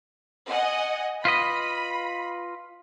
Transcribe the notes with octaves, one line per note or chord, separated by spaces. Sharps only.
D#5 F#5 G#5
F4 B4 D#5 B5